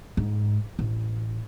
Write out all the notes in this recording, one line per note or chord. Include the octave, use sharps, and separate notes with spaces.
G#2
A1